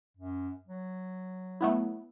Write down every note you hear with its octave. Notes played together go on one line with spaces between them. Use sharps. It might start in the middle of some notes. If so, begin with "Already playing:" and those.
F#2
F#3
A3 B3 E4